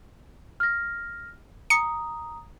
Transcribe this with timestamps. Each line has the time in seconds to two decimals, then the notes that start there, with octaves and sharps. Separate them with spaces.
0.60 F6 A#6
1.70 A#5 D#6 C#7